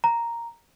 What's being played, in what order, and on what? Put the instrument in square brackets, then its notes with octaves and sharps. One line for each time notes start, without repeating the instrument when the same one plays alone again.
[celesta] A#5